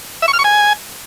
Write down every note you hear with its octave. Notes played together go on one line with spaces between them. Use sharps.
E5
C#6
F6
C#6
G#5